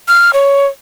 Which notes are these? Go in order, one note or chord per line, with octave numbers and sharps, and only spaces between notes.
F6
C#5